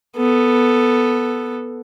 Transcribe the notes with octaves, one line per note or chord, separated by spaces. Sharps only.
B3 A4